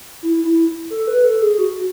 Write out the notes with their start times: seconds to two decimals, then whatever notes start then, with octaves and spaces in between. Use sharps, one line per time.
0.23 E4
0.44 E4
0.90 A4
1.07 B4
1.24 A4
1.41 G#4
1.58 F#4